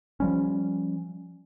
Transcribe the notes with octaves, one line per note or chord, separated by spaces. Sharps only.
F3 G3 C#4